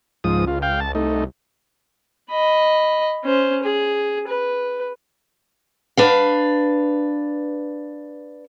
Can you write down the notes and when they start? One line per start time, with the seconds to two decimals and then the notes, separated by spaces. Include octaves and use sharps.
0.24 C#2 G#2 F3 D#6
0.48 F4
0.62 F5 G5
0.80 A5
0.95 C2 A3 D#4
2.30 D#5 B5
3.24 C#4 C5
3.63 G#4
4.28 B4
5.97 D4 B4 F5